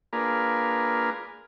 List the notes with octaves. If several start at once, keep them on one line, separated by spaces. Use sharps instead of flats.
A#3 D4 F4 G#4 A#4 B4